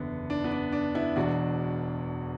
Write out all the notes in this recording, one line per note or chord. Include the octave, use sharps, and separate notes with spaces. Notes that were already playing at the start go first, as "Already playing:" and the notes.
Already playing: F#1 E2 D3 B3
D4
B3
D4
D4
B3 E4
E1 E2 B2 D4 F#4